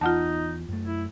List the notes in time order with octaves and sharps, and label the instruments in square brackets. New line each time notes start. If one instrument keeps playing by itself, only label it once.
[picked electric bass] E2 [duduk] D#4 [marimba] F4 F#5 A5
[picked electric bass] F#2 A3
[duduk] E4